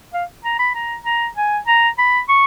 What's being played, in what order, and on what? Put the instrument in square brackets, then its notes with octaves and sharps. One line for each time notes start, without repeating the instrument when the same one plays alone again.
[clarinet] F5
A#5
B5
A#5
A#5
G#5
A#5
B5
C#6